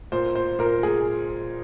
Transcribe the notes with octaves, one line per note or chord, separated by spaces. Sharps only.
A#2 C5
C5
A#2 A#4
G#4